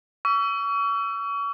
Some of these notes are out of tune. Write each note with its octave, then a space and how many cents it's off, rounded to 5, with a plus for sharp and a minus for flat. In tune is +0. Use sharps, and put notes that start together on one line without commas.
C#6 +40 E6 +30